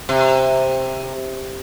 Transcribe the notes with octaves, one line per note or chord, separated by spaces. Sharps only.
C3